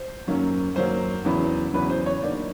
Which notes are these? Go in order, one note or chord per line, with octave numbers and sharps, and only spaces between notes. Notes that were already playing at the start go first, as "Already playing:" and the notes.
Already playing: C5
F#2 D#3 F#3 A#3 C#4
F#2 D#3 F#3 A#3 C#4 C5
E2 C#3 F#3 B3 E4
E2 C#3 F#3 B3 E4 B4
C5
C#5
D3 F#3 A#3 D#4 D5